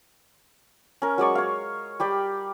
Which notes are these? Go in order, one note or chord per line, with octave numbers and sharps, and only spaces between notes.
C#4 A#4
F#3 G#3 D5 C#6
C#5 F5
G3 G4 D5